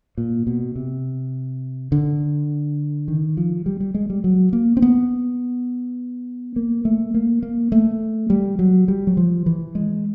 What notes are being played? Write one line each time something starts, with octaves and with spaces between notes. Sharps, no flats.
A#2
B2
C3
D3
D#3
F3
G3
G3
G#3
G3
F#3
A#3
C4
B3
A#3
A3
A#3
A#3
A3
G3
F#3
G3
F#3
F3
E3
G#3